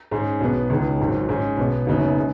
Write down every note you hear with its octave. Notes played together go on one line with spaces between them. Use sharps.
G#2 G#3 C#4
B1 B2 B3
C#2 C#3 G#3 D#4
G#1 G#2 F#3
G#2 G#3 C#4
B1 B2 B3
F#1 F#2 C#3 B3 D#4
G#3